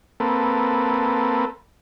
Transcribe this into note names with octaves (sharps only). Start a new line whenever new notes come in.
A#3 C4 A4 B4